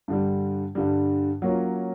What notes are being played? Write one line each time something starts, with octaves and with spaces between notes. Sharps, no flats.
G2 D3 G3
G2 D3 G3
F#3 A#3 C#4 F4